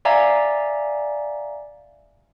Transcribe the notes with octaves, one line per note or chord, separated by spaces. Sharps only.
D5 E5 F5 G#5 A#5